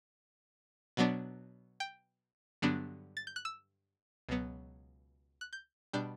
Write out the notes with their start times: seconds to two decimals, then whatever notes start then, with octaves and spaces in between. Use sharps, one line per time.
0.97 B2 F#3 B3 D4
1.80 G5
2.62 G2 D3 F#3 B3 D4
3.17 A6
3.27 G6
3.36 F#6
3.45 E6
4.29 C#2 B2 F#3 B3
5.41 F#6
5.53 G6
5.93 B2 G3 D4 G6